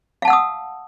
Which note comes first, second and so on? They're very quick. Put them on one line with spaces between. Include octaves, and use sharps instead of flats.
F5 A5 F#5 E6 D#6